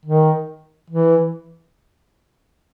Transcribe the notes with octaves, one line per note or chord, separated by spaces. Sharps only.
D#3
E3